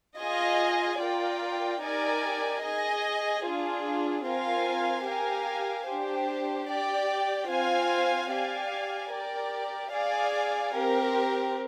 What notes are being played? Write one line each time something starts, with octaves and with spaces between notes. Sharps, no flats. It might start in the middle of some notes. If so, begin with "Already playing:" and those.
F4 G#4 D#5 G#5
F4 A#4 D5 G5
D#4 G4 A#4 D5 G#5
G#4 D#5 G#5
D4 F4 G#4
C4 F4 A#4 F5 G#5
G4 A#4 F5 G#5
D4 G4 C5
G4 D5 G5
C4 F4 C5 F5 G#5
G4 D5 F5 G#5
G4 A#4 D5
G#4 D5 F5 G#5
C4 G4 A#4